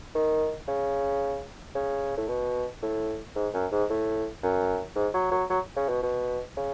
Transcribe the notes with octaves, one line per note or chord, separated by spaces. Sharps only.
D#3
C#3
C#3
A2
B2
A2
G#2
F#2
G#2
A2
F#2
G#2
F#3
F#3
F#3
C#3
B2
B2
C#3